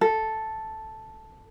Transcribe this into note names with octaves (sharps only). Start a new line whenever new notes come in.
A4